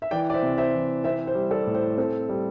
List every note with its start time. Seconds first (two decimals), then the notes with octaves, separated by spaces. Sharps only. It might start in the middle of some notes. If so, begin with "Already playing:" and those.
0.02 E5
0.11 E3 D5 G5
0.30 D5
0.34 C5 E5
0.42 C3
0.58 C5 E5
0.74 E3
1.04 C4 C5 E5
1.27 C5
1.35 G3
1.51 A4 D5
1.67 A2
1.75 C5
1.97 C4 A4
2.29 G3